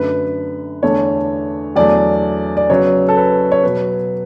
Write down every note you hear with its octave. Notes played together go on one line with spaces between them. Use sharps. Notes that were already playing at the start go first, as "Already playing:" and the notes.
Already playing: F#2 D3 A3 B4
E2 D3 A3 C#5
E2 D3 F#3 A3 D5
D5
C#3 F#3 B3 C#5
A4
B4
C#5
B2 F#3 B3 B4